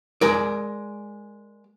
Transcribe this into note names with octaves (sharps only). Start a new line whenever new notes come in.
G#3 A#4 D5